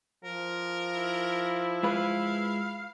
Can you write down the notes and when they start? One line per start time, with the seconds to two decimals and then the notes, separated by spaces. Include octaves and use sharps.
0.24 F3 A#4
0.94 E4
1.83 G#3 F4 B4 F5